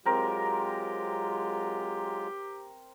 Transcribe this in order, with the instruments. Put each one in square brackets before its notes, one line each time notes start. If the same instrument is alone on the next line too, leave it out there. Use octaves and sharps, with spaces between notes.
[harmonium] F#3 G#3 F4 [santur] C4 A#4 [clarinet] G4